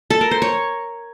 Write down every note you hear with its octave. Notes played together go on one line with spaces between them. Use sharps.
A4
A#4
C5
C#5